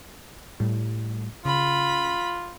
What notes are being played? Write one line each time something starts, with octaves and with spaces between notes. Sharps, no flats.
A2 G3
C#3 F4 B5